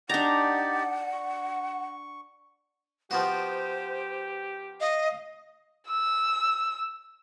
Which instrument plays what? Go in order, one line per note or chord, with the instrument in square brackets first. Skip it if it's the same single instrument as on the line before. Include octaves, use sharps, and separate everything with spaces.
[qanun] D4 A#5 [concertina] D#4 G4 D5 [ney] F#5
[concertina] C#6
[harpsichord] F3 B3 F#4 [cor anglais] G4 [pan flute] C5
[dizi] D#5 [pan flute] F5
[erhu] E6